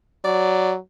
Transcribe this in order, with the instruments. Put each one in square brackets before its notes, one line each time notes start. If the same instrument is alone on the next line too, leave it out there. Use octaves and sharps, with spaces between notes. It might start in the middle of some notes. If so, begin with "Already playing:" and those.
[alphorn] F#3 [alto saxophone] D5